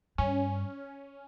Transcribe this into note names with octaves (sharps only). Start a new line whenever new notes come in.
G2 C#4